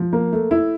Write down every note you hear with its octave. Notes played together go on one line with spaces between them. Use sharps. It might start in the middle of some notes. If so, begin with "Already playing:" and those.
Already playing: F3
A#3
A3
E4